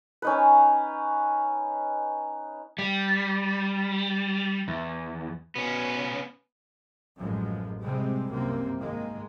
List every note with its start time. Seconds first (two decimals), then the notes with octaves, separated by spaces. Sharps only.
0.22 C#4 D#4 B4
2.78 G3
4.68 E2
5.56 B2 B3 C#4
7.17 A1 F#2 F3 G#3
7.83 C3 G3 G#3 C4
8.29 C2 F#2 C3 A#3 C4
8.79 G#2 D#3 G#3 A#3